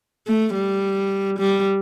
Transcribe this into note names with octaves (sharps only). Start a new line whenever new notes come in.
A3
G3
G3